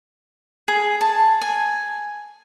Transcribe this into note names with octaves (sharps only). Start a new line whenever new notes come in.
G#4
A5
G#5